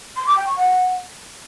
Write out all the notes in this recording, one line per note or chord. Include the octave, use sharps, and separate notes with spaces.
C6
D6
G5
C#6
F#5